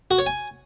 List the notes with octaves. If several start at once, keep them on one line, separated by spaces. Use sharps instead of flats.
F#4
C#5
G#5